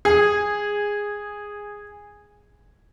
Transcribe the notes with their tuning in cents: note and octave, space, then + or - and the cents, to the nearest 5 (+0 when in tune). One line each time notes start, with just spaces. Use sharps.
G#4 -10